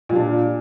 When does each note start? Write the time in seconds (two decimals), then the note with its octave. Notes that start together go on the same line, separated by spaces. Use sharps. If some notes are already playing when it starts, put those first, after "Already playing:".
0.09 A#2
0.12 G3
0.15 D4